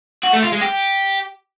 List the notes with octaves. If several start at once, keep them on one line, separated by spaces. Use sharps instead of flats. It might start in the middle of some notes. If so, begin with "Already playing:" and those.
F#4
A3
F4
G#3
G4